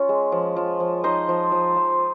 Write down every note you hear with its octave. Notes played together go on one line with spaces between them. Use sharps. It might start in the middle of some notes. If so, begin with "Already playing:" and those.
Already playing: C#4 F4
G#3
F3
F3
F3
D#4 C5 D#5
F3
F3
F3